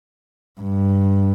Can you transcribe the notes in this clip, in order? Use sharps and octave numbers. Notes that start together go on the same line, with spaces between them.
G2